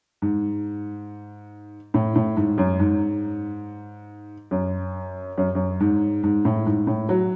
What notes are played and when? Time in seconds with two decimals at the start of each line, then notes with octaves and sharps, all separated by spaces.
0.22 G#2
1.94 A2
2.16 A2
2.37 G#2
2.58 F#2
2.80 G#2
4.51 F#2
5.38 F#2
5.55 F#2
5.80 G#2
6.23 G#2
6.45 A2
6.66 G#2
6.87 A2
7.09 F#3